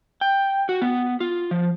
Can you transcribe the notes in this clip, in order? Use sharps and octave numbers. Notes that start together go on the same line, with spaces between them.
G5
F#4
B3
F4
F3